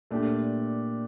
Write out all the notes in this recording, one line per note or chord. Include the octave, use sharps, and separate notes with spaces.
A#2 A3 D4 G4